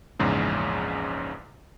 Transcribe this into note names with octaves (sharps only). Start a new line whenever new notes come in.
A#1 E2 G#2 C#3